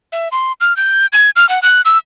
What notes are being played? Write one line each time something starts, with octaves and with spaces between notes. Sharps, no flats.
E5
C6
F6
G6
G#6
F6
F#5
F#6
E6